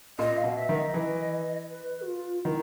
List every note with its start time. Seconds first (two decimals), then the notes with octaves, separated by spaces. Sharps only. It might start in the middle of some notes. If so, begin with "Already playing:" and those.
0.19 A#2 D#5
0.38 F5
0.44 B2
0.56 E5
0.69 D#3
0.75 D#5
0.94 E3
1.69 B4
2.02 F#4
2.07 F4
2.45 D#3 E4